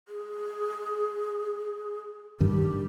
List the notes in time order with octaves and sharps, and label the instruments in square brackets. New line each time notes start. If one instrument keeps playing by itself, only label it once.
[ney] G#4
[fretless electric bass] G2 D#3 [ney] G4